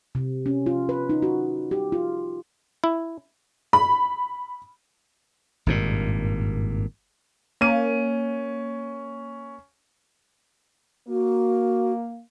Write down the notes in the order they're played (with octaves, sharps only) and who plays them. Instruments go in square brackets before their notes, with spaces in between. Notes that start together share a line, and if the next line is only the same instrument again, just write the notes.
[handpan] C3
C#4
F4
B4
D#4
F#4
G4
F4
[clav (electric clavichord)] E4
[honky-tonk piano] B5
[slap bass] G#1 G2 A#2
[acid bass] A#3 [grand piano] C#4 D#7
[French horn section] A#3 [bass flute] F#4